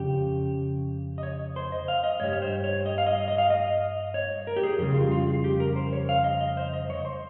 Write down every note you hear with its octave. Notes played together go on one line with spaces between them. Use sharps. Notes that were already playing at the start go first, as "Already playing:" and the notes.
Already playing: F2 C#3 G4
D#5
C#5
C5
D#5
F5
D#5
G2 G3 C#5
C#5
C5
C#5
D#5
F5
D#5
D#5
F5
D#5
C#5
A#4
G4
G#4
F2 C#3 G3 G#4
F4
F4
G#4
G4
A#4
C5
C#5
F5
D#5
D#5
C5
D#5
C#5
C5